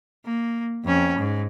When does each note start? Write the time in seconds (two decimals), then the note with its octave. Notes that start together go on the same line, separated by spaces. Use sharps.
0.24 A#3
0.84 F2 C#4
1.18 G#2